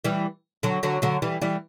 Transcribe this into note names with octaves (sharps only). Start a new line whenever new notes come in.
E3 G3
D3 F#3
D3 F#3
D3 F#3
E3 G3
E3 G3